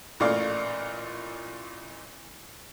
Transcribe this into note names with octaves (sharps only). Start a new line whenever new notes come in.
A1 A#2 A3 D5 F5